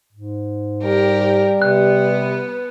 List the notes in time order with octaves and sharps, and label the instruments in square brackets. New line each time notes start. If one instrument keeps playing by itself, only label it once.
[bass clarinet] G#2
[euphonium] G3 [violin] G4 A#4
[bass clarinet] C3 [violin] B3 B4 [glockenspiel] F#6